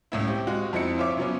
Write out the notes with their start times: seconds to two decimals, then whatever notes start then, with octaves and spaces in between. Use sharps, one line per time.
0.12 C#2 A2 E4
0.28 C4 G4
0.47 G#3 F4 F#4
0.73 F2 C4 D#4 E4 C#7
0.98 F4 C5 C#5 E5 D6
1.17 C#3 F#3 B3 C#4